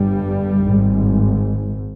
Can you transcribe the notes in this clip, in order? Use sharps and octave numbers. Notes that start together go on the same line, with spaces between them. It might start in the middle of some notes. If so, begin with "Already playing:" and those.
Already playing: G1 G2 G3
G#1 G#2